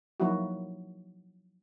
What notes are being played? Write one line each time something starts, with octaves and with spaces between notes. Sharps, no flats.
F3 F#3 A#3 D#4 E4 F#4